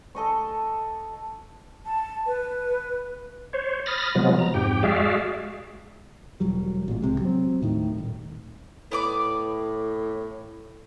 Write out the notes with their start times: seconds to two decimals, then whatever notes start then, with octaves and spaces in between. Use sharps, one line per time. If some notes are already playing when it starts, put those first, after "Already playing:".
0.15 A4 D#5 C#6
1.86 A5
2.27 B4
3.53 C5 C#5
3.86 B5 D#6 F6 A6 A#6
4.15 C3 F3 F#3 G#3 B3
4.39 A#5
4.54 F2 G#2 G4 G5
4.83 G#3 F#4 G#4 D5 E5 F5
6.40 E1 E2 F#3 G3
6.88 A1 A#2
7.02 C2 C3 G#3
7.21 F#3 C4
7.61 D#2 A2 D#3
7.98 D#1
8.92 A2 B3 D5 D6